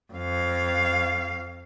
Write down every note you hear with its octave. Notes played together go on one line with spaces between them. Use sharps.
F2 F5